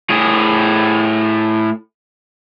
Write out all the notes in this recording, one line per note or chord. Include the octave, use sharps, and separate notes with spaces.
A2 G#4